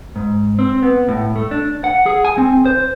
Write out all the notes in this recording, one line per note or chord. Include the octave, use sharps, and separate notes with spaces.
G#2
C4
B3
A2
A3
D4
F#5
G#4
G#5
C4
C5